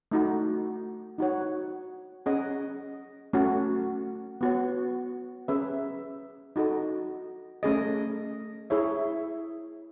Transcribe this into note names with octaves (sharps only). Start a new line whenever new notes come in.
A3 D#4 F#4
D#4 F#4 C#5 F#5
C#4 G#4 D#5 F#5
A3 C#4 F#4
B3 F#4 C#5
C#4 G#4 B4 E5
D#4 F#4 A4 D#5
A3 C#4 G#4 D#5
E4 G#4 C#5 E5